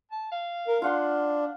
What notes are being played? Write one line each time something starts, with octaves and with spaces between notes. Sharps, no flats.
A5
F5
A#4
D4 F4 F#5 C6